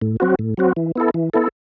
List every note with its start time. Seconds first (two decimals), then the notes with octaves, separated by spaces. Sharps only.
0.01 A2
0.20 F#3 C4 F#4
0.39 A2
0.57 F#3 C4 F#4
0.76 E3
0.96 B3 E4 A4
1.14 E3
1.34 B3 E4 A4